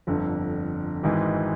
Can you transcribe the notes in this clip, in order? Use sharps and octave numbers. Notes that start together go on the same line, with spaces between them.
G1 F2 D3
G#1 G#2 E3 G#3